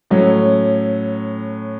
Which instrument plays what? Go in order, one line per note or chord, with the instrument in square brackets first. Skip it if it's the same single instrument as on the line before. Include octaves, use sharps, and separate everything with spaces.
[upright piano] A2 F#3 C#4